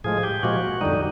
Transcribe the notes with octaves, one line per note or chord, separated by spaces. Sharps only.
A2 F3 G#3 G#4
G4
A#2 F3 G#3 F#4
F2 D3 G3 D#4